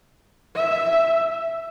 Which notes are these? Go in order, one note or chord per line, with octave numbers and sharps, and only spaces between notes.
E5